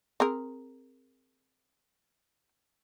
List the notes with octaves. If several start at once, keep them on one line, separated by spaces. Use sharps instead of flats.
C4 G#4 A#4